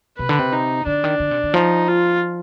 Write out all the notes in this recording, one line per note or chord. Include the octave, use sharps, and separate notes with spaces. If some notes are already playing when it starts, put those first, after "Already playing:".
C3 B4
D3
C3
D#4
D3 D4
D#3
D3
C3
D3
F3 D#4
F4